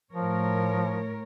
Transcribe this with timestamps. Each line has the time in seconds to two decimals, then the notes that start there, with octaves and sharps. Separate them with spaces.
0.13 A2 F3 A#4 C#5